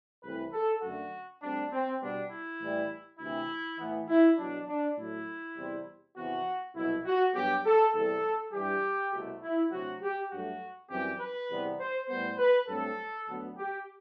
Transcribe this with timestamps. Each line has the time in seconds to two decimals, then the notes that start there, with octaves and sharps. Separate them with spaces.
0.23 C2 C3 E3 A3 C4 B4
0.53 A4
0.82 F#2 D3 A3 F#4
1.42 D2 D3 G3 C4 D4
1.72 C4
2.01 B2 G3 B3 D4
2.31 E4
2.61 A2 E3 G3
3.20 D2 C3 E3 E4
3.79 A2 E3 B3
4.08 E4
4.38 E2 B2 F#3 D4
4.68 D4
4.97 A2 F#3 A3 E4
5.57 E2 C3 G3 C4
6.16 E2 C3 E3 B3 F#4
6.75 C2 B2 F#3 E4
7.05 F#4
7.35 G2 F#3 B3 G4
7.65 A4
7.94 E2 C3 G3 A4
8.53 G2 E3 G3 G4
9.12 C2 B2 A3
9.42 E4
9.72 D2 C3 F#3 F#4
10.02 G4
10.31 G2 F#3 A3 F#4
10.90 F#2 E3 G3 C4 G4
11.20 B4
11.50 E2 C3 G3 B3
11.79 C5
12.09 A2 G3 B3 C5
12.38 B4
12.68 G2 F#3 A3 C4 A4
13.27 D2 D3 F#3 B3
13.57 G4